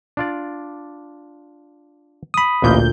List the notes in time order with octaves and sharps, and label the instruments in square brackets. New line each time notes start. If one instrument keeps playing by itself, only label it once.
[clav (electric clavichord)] D4 F4 D5
[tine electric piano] B5 D#6
[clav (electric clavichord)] A1 A#3 D#5 [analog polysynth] D2 A#2 G6